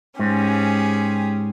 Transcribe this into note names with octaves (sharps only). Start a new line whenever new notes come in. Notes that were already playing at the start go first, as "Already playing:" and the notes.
G#2 C#4 G4 G#4